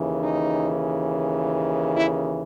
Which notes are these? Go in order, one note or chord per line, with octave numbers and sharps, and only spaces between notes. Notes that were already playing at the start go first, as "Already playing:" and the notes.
Already playing: D#2 C#3 E3
D#4
E4